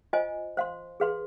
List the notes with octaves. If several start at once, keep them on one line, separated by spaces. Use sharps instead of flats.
F4 C5 D#5 G#5
C5 F5 C6
G#4 B4 F5 C6